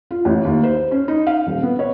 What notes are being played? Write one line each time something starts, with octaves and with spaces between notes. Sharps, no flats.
F4
A1
D#2
C5
C#4
D#4
F5
D#1
B3
C#5